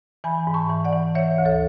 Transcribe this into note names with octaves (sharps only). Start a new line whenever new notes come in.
E3 G#5 B5
G#2
A5 C#6
E3
D5 F#5
E3
E3 C#5 E5
D2
A4 C#5